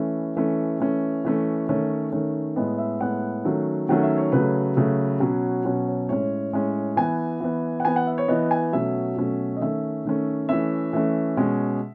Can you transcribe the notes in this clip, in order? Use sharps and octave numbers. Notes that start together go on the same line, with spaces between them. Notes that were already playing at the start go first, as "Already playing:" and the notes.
Already playing: E3 A3 C#4 B4
E3 A3 C#4
E3 A3 C#4
E3 A3 C#4
D#3 A3 C#4 C#5
D#3 A3 C#4
A2 G#3 B3 D#5
E5
A2 G#3 B3 F#5
D#3 F#3 A3 C#4
D#3 F#3 A3 C#4 F#5
E5
C#5
C#3 F#3 A3 B4
C#3 F#3 A3
B2 F#3 C#4
B2 F#3 C#4 C#5
C#5
A2 G#3 C#4 C#5
A2 G#3 C#4
E3 B3 G#5
E3 B3
F#5
E3 B3 G#5
F#5
E5
C#5
E3 B3 D#5
G#5
B2 F#3 A3 C#4 E5
B2 F#3 A3 C#4
D#5
D#3 A3 C#4 E5
D#3 A3 C#4
E3 A3 C#4 E5
E3 A3 C#4
B2 G#3 C#4